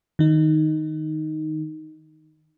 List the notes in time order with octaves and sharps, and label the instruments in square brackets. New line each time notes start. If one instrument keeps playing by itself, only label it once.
[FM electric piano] D#3 D#4